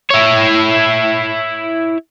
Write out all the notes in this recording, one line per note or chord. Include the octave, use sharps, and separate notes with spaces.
E4 C#5